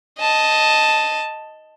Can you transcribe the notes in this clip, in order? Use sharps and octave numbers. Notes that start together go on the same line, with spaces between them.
D#5 A5